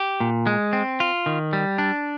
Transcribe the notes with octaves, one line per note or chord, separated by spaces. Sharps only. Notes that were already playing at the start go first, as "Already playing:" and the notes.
Already playing: G4
A#2
G#3
C4
F4
D#3
G3
D4